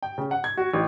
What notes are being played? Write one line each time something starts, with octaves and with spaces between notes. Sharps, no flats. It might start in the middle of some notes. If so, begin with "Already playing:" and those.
G5
C#3
F#5
G#6
F#4
A1